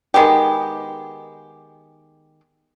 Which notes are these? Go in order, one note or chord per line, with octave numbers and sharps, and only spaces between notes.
D#3 G#3 B3 G4